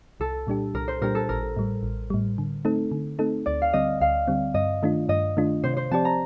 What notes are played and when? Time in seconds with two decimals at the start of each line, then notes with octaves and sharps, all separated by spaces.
0.20 C2 A4
0.47 A#2 G3 D4 G4
0.74 C2 A#4
0.88 C5
1.02 A#2 G3 D4 G4 A#4
1.15 A4
1.29 A1 A#4
1.56 A2 G3
1.83 A1
2.10 A2 G3
2.38 D3
2.65 A3 C4 D#4 A4
2.92 D3
3.19 A3 C4 D#4 A4
3.46 D2 D5
3.62 F5
3.73 D3 G3 C4 D#5
4.01 D2 F5
4.28 D3 G3 C4
4.54 G2 D#5
4.83 D#3 A3 D4 F4
5.09 G2 D#5
5.37 D#3 A3 D4 F4
5.63 C3 C5
5.77 C5
5.91 F3 C4 G4 D5 A5
6.05 A#5